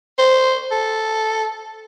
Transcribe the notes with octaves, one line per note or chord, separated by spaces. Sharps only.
C5
A4